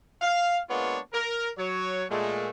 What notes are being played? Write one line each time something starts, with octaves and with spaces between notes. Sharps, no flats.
F5
G#3 A#3 B3 D4 F4 C#5
A#4
F#3 C#5
A#2 G#3 A3